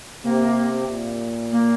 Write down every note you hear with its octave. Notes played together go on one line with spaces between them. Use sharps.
C3 A#3
A#2
A#3